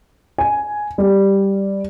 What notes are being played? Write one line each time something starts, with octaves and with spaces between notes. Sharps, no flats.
G#5
G3